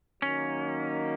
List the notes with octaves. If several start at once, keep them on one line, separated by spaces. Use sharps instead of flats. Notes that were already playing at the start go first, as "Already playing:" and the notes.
D#3 F#3 A#3 C#4